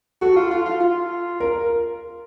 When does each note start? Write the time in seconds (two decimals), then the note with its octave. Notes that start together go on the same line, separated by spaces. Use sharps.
0.22 F#4 A4
0.36 F4
0.51 F4
0.66 F4
0.80 F4
1.40 A#4